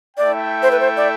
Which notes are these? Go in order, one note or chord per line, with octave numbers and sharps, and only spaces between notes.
A3 E4 A4 D5 E5 G5
C5
B4
C5
D5